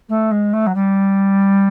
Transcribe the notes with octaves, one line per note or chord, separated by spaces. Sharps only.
A3
G#3
A3
F#3
G3